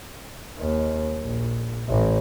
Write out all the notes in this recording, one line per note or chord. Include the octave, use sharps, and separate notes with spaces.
D#2
A#1
A1